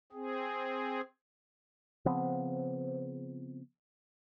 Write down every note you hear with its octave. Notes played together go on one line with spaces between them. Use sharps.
C4 G#4
C#3 F3 B3 C4